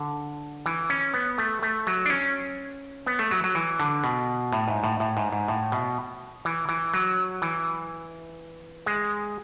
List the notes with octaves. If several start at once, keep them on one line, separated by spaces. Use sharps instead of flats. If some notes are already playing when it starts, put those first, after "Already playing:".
Already playing: D3
E3
C#4
B3
A3
A3
F#3
D4
C#4
B3
A3
F#3
F#3
E3
D3
B2
A2
G#2
A2
A2
G#2
G#2
A2
B2
E3
E3
F#3
E3
G#3